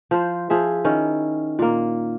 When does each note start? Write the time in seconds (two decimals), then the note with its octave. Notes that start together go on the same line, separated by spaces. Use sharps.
0.11 F3 C5
0.50 F3 G#4 E5
0.85 D#3 C#4 E4
1.59 A#2 A#3